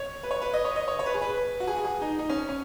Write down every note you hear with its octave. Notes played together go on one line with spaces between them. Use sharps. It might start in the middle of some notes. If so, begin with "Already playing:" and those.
Already playing: C#5
B4
C#5
B4
D#5
C#5
D#5
C#5
C#5
B4
G#4
B4
F#4
G#4
F#4
G#4
D#4
D#4
C#4
C#4